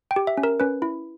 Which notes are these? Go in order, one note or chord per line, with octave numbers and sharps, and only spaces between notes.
G5
G4
E5
C#4
A#4
C#4 B4
E4